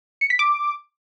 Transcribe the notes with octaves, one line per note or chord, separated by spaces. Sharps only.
C#7
B6
D6